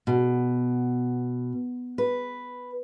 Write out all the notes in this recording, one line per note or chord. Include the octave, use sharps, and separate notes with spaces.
B2
B4